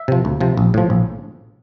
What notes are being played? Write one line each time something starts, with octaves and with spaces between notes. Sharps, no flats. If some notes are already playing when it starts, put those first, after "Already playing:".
Already playing: E5
C3 F3
D2
C3 F3
A#1
A2 F3
A#1